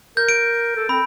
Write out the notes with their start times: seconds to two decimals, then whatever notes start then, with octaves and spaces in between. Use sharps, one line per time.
0.17 A#4 G6
0.29 D7
0.76 A4
0.89 C4 B5